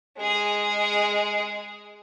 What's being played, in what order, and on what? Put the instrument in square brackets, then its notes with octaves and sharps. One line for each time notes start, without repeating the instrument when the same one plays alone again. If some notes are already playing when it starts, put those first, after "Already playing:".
[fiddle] G#3 G#4